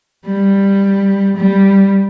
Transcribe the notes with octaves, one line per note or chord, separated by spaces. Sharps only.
G3
G3